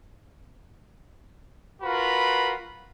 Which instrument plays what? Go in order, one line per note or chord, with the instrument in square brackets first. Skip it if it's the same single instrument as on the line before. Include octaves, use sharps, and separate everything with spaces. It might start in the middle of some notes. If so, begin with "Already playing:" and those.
[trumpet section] F4 F#4 A#4 B4 B5